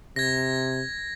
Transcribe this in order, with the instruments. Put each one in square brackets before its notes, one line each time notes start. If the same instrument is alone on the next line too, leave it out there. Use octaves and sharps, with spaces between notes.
[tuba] C3 [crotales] G#6 A#6